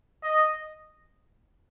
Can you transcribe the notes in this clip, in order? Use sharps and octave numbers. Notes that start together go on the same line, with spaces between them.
D#5